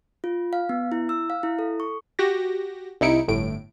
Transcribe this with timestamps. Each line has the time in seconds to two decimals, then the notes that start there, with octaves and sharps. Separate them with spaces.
0.24 F4
0.53 F5
0.69 B3
0.92 E4
1.09 E6
1.30 F5
1.43 E4
1.59 A4
1.80 C#6
2.19 F#4 G4 A#6
3.01 C2 D#4 E4 C#7 D7
3.28 G1 A2 D7